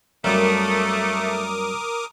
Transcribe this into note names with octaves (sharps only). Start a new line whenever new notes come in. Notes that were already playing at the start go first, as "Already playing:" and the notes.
F#2 G3 A3 A#3 A#4 D6 D#6